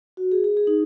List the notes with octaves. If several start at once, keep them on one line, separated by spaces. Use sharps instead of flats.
F#4
G#4
G#4
G#4
D#4